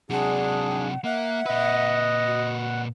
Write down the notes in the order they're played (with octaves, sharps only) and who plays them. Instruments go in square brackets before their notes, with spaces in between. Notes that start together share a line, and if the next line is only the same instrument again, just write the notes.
[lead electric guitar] C3 F#3 [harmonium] D4 G#4 [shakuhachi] F#5
[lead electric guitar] A#3 [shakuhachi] E5 [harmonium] F#5
[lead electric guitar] A#2 B4 [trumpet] D#5
[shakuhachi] F#4